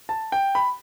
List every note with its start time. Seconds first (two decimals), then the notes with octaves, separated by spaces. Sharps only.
0.09 A5
0.32 G5
0.55 B5